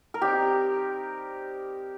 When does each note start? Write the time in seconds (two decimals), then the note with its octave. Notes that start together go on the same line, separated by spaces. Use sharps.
0.14 A#4
0.21 G3 C4 D#4 G4